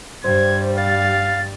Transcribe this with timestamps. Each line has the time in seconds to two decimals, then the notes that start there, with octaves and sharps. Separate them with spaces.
0.24 G2 G3 C5 G#6
0.78 F5 A6